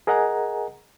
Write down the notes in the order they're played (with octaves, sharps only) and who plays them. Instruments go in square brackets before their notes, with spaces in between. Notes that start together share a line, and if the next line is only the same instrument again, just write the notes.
[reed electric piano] G#4 A#4 D#5 F#5 G#5 A#5